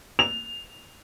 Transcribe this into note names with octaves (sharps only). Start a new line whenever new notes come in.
F7